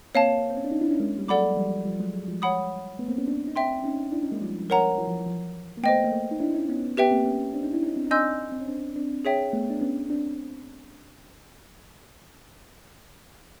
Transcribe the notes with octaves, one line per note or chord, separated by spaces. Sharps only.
A#3 C4 C#5 F5 A5
C4
C#4
D4
C#4 D#4
D4 E4
C#4 D#4
G#3 A#3
G3
F#3 G#3 A4 D5 F#5 B5 D6
F#3
F3 G3
F3 G3
F#3 G#3
F#3 G#3
F3 G3
C#5 F#5 B5 D#6
A3 B3
A#3 C4
B3 C#4
C4 D4
D#4
C4 D4 E5 G5 C6
C#4 D#4
D4 E4
C#4 D#4
G#3 A#3
F3 G3
A#4 C#5 F#5 A#5
E3 F#3
F3
E3
F3
A#3
A3 B3 C5 D#5 G5
A#3
A3 B3
D#4
D4 E4
C#4 D#4
B3 C#4
B3 G4 B4 E5 G5
A#3 C4
B3 C#4
C4 D4
C#4 D#4
D4 E4
C#4 D#4
C4 D4
D#4
C4 D4 D#5 G#5 C6 E6 G6
C4
C#4
C4 D4
C4 D4
G#4 C#5 E5 G5
A3 B3
D4
B3 C#4
C4 D4